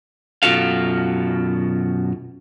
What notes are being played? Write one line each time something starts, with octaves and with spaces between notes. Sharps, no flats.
F#2 B2 F4 F#4 A4 F5